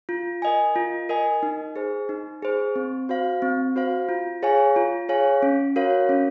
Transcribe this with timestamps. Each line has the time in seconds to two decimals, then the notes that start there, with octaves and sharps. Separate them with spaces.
0.09 F4
0.42 A#4 D#5 G#5
0.76 F4
1.09 A#4 D#5 G#5
1.43 D#4
1.76 G#4 C5
2.09 D#4
2.42 G#4 C5
2.76 C4
3.09 F#4 C5 F5
3.42 C4
3.76 F#4 C5 F5
4.09 F4
4.42 G#4 C#5 F5 G#5
4.76 F4
5.09 G#4 C#5 F5 G#5
5.42 C#4
5.76 F#4 A#4 C#5 F5
6.09 C#4